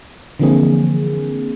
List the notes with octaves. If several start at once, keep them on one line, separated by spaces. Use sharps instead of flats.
D3 E3 F3 A#3 C4 G#4